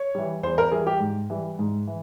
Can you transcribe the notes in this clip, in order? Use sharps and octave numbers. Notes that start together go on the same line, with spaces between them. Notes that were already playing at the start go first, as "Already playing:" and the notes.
Already playing: C#5
E3 G3
E2 C5
A#4
E3 G3 G#4
G4
G#2
E3 G3
G#2
E3